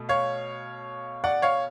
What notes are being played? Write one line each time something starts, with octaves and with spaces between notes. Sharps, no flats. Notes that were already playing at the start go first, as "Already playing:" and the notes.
Already playing: B2 A3
C#5 F5
D5 F#5
C#5 F5